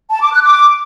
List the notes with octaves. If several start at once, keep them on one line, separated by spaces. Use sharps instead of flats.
A5
D6
F#6
D6